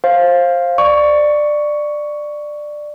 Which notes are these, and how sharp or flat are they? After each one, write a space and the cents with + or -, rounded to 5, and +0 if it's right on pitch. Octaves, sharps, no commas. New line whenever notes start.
C5 +20 F5 +0
D5 +15 C#6 +10